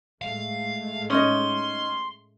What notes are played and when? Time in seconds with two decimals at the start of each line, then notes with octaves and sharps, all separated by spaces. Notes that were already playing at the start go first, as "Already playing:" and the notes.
0.22 A2 G#3 A3 F5
1.10 C#4 D#4 D#5 C6